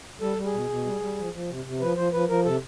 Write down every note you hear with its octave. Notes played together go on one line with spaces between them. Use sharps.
G3 A4
G3
G#4
B2
B2
G3
G3
F3
F3
C3
C3
F3 B4
F3 C5
F3 B4
F3 A#4
C3 A4